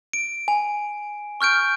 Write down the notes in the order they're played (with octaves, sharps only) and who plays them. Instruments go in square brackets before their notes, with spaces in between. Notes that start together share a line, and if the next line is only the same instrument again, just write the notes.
[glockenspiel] D7
G#5
C#6 F6 G6 D7